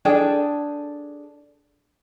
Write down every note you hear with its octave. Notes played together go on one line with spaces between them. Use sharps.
D4 G#4 A4 G5